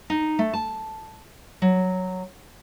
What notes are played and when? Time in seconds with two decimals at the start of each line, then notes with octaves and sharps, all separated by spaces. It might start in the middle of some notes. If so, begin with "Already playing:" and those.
0.10 D#4
0.39 A3
0.54 A5
1.62 F#3